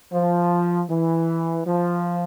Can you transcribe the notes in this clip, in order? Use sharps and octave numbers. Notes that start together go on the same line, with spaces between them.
F3
E3
F3